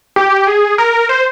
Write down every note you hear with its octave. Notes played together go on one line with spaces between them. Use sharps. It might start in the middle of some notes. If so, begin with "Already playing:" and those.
G4
G#4
A#4
C5